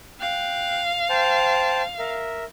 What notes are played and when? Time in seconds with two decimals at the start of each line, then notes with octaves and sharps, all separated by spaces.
0.20 F5 G5 F#6
1.09 C5 G5 A5
1.99 A#4 E5